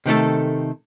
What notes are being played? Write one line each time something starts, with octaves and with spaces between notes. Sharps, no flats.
C3 D#3 A3 A4